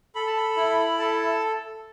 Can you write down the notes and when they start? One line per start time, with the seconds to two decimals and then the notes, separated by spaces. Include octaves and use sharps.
0.15 A4 B5
0.27 A5
0.37 B5
0.56 E4
0.99 A4 A5